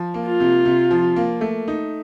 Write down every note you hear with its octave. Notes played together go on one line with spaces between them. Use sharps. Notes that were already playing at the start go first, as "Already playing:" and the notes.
Already playing: F3
A#3
F4
C3
C3
F3
A#3
A3
D#4